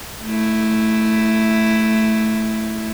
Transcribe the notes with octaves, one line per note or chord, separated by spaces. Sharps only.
A3 E4